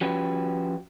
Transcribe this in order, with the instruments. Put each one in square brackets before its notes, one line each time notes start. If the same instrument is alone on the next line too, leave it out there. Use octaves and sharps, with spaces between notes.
[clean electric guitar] F3 C#4 F#4 G4 B4